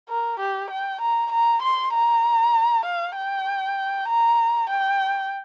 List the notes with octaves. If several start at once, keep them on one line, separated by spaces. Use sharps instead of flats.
A#4
G4
G5
A#5
A#5
C6
A#5
F5
G5
A#5
G5